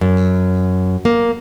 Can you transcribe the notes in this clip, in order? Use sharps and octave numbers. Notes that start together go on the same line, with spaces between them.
F#2
A#3